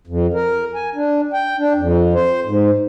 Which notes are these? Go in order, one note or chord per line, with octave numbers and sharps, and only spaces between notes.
F2
A#4
G#5
D4
G5
D4
F2
C5
G#2